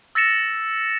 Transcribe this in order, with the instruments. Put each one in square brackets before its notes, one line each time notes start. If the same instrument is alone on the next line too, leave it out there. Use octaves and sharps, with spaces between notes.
[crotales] E6 A6 A#6 C#7 E7